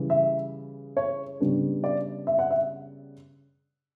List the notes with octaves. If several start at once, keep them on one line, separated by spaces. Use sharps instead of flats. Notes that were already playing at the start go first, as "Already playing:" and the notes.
Already playing: C#3 E3 G3
E5
C#5
C#3 G3 B3 D4
D5
E5
F#5
E5